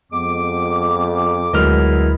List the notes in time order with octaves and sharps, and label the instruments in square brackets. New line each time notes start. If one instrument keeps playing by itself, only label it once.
[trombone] F2 [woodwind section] G#3 B3 D6
[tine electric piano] D2 A#4 F6 [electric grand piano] F#3 G#3 D#5 [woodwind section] B3 E4